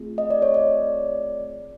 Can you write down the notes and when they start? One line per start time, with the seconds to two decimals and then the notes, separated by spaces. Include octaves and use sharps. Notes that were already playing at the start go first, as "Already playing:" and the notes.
Already playing: A3 C4 F4 G#4
0.18 D#5
0.30 D5
0.42 C#5
0.54 D5